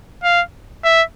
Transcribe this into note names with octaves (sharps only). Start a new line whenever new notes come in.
F5
E5